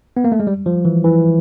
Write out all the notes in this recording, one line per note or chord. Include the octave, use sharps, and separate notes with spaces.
B3
A#3
A3
G#3
G3
F3
E3
E3